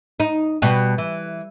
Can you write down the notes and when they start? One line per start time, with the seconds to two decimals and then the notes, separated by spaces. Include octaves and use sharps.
0.20 D#4
0.62 B2 G3
0.98 E3